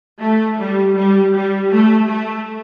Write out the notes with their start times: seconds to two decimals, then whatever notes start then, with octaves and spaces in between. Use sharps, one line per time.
0.20 A3
0.59 G3
0.96 G3
1.34 G3
1.71 A3
2.09 A3